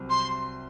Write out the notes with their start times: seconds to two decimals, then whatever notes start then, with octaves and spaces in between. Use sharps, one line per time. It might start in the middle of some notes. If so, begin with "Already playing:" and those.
Already playing: C2 C3 F#3 C4
0.10 C6